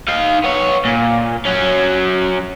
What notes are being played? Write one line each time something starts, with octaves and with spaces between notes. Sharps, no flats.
D#4 F5
B3 C#5
A#2
F#3 C#4